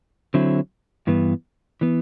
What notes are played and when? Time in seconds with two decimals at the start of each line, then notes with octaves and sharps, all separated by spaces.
0.34 D3 F#3 C4 E4
1.07 G2 E3 B3
1.81 E3 B3